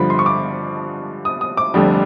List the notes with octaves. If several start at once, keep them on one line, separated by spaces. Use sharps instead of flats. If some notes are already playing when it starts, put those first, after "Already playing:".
Already playing: G2 D3 F3 B5
C6
C#6
D6
D#6
D#6
D6
F1 F2 D3 G3